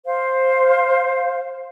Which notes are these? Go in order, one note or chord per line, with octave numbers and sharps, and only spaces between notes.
C5 F5